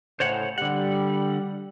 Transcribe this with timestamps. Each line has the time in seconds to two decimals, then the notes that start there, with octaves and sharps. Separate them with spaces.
0.20 A2 C#3 C5 C#5 F#5
0.58 D3 G3 F#5